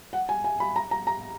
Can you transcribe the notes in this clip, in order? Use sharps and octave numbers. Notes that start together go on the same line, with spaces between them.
F#5
G#5
G#5
B5
A#5
A#5
A#5